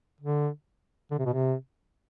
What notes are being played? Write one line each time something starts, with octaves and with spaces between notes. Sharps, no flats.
D3
D3
C3
B2
C3